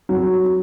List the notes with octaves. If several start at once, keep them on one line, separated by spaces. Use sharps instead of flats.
F#3